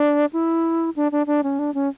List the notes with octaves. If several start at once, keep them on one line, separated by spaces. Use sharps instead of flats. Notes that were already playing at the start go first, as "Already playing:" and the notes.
Already playing: D4
E4
D4
D4
D4
C#4
D4
C#4